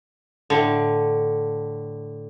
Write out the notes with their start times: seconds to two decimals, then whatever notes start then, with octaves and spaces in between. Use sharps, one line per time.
0.50 A2 D3